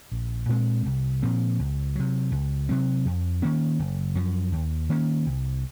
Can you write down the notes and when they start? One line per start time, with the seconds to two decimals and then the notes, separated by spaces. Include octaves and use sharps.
0.12 A#1
0.49 A#2 G#3 C4
0.86 C2
1.22 A#2 F3 C4
1.59 C#2
1.95 C3 F#3
2.32 C#2
2.69 C3 F#3 C4
3.05 F2
3.42 D#3 A#3 C#4
3.79 F#1
4.15 F#2 F3
4.52 D#2
4.90 D#3 A#3 C#4
5.26 C2